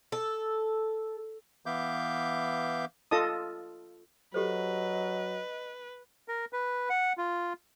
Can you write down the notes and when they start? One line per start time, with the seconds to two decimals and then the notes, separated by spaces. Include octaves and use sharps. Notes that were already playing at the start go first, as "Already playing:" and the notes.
0.12 A4
1.66 E3 B3 E5 F5 D6 G6
3.11 F4 A4 D#5 A5 D#6
4.34 F#3 G4 A4 B4 C5 D#5
6.28 A#4
6.53 B4
6.89 F#5
7.18 F4